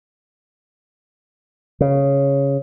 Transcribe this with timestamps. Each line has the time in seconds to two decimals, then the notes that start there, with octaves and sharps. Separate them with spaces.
1.81 C#3